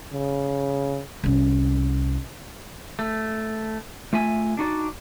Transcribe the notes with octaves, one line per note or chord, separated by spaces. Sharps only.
C#3
C2 C#4
A3
A3 F4 E5 G#5
D4 D#4 F#4 D5